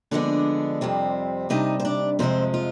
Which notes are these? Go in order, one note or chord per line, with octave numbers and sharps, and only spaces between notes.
D3 F3 G#3 B3 D4 D5
F2 C3 G3 C4
C3 G3 D4 D#4 D#5
C5
D4 D5
F2 C3 F3 G#3 C4 C5
F4